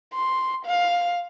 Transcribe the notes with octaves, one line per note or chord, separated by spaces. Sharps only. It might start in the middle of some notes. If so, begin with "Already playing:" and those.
C6
F5